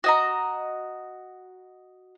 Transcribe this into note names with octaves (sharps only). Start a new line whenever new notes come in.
F#4 D#5 A#5